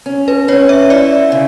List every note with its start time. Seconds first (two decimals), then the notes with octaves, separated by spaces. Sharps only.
0.06 C#4
0.28 B4
0.48 C#4 C#5
0.69 E5
0.90 E4 D5
1.32 C#3